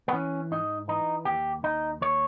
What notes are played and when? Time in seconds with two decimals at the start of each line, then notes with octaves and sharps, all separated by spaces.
0.08 B3
0.13 E3 C#4
0.51 G#2 D#4
0.88 E3 D#4
1.25 D#2 G4
1.63 D#2 D#4
2.01 D#2 C#5